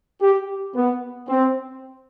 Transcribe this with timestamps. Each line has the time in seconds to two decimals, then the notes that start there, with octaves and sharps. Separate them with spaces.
0.21 G4
0.75 B3
1.28 C4